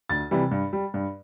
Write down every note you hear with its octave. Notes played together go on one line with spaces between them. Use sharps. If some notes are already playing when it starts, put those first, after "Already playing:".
D2 A6
C3 E3 G3
G2
G3
G2